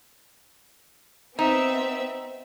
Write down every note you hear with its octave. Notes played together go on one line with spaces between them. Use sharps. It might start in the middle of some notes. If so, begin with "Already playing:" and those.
B3 C4 D#4 E5